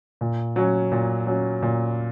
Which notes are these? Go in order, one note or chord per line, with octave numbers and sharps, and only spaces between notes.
A#2
F#3 C#4
A#2
F#3 C#4
A#2